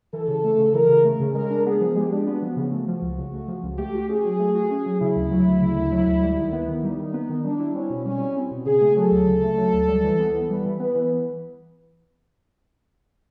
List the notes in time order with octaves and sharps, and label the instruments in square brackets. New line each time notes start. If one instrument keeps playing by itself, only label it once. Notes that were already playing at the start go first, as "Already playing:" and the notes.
[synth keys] E3 [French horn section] A4
[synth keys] C#3
A3
C#3
[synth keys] E3 [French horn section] A#4
[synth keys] C#3
A3
C#3
[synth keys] G#3 [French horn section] A#4
[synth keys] D4
[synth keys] B3 [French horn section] G#4
[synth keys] F3
[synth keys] G#3 [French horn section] G4
[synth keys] D4
[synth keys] B3 [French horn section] F#4
[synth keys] F3
[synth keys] C#3 [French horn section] F#4
[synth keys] A3
F3
C#2
C#3
A3
F3
C#2
[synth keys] A3 [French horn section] G4
[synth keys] F#4
[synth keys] C#4 [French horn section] G#4
[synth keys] F#3
A3
F#4
C#4
F#3
[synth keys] C#3 [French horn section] E4
[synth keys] D2
F#3
D2
C#3
D2
F#3
D2
G3
D#3
B3
D#3
[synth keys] G3 [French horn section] D#4
[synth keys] D#3
B3
D#3
[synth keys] G3 [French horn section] D4
[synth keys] E4
[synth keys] C4 [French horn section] C#4
[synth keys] B2
[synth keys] G3 [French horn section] C#4
[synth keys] E4
C4
B2
[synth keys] C#3 [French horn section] G#4
[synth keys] A3
[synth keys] F#3 [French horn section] A4
[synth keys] D2
C#3
A3
F#3
D2
G3
E3
B3
E3
[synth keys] G3 [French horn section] B4
[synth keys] E3
[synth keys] B3 [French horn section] B4
[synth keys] E3